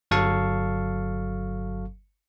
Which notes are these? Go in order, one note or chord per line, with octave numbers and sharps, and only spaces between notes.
G1 F#3 A4 F5 A5 C#6